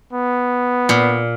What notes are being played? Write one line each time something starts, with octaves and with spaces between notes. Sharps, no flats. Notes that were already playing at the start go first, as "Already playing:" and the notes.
B3
A#2